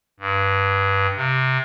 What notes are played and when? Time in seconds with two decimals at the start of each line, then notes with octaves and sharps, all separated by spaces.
0.20 G2
1.16 C3